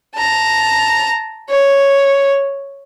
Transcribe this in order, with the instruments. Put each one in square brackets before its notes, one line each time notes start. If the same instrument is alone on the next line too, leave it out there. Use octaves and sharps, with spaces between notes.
[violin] A5 A#5
C#5